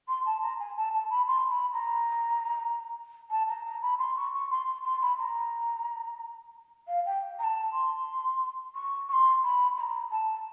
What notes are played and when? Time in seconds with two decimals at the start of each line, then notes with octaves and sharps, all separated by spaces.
0.08 C6
0.25 A5
0.42 A#5
0.59 G#5
0.76 A5
0.92 A5
1.10 B5
1.27 C6
1.50 B5
1.73 A#5
3.30 A5
3.48 A#5
3.65 A#5
3.82 B5
3.99 C6
4.16 C#6
4.33 C#6
4.50 C6
4.84 C6
5.01 B5
5.18 A#5
6.87 F5
7.05 G5
7.38 A#5
7.43 A5
7.73 C6
8.74 C#6
9.08 C#6
9.13 C6
9.43 B5
9.77 B5
9.80 A#5
10.11 A5